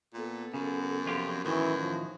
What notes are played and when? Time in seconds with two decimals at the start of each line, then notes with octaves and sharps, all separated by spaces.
0.14 A#2 B3 A4
0.54 F#2 C#3
1.06 F2 C3 F4 G4
1.45 F#2 A2 D#3 E3
1.79 F3